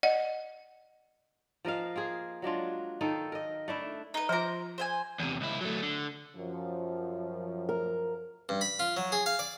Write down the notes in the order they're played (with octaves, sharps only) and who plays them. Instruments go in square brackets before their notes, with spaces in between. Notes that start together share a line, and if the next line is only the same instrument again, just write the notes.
[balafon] D5 D#5 F#5
[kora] F3 A#4 D#5 F5
A#3 F4 G#4
F#3 G#3 D4 F4
D#3 D#4 A4
A#4 D#5
A3 D4 E4
[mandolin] D#4 B4
[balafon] F3 F4 [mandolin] C5 A#5
[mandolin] C5 E5 G#5
[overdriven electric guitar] E2 C3
C#2 E4
F#3 A3
D3
[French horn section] F#2 F3
[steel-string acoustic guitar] A#4
[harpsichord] G2
B5
F4
F#3
G#4
F5
D5